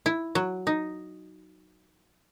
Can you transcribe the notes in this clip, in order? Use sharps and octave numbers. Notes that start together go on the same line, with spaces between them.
E4
F#3
D#4